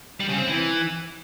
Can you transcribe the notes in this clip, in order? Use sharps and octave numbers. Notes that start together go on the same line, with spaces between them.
G3
C#3
C4
E3